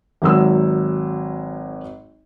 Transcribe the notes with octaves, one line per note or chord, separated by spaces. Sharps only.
G#1 F#3 E6